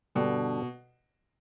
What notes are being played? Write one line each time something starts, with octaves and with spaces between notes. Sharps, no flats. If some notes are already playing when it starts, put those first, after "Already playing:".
G2 B2 D3 G3 D4 A4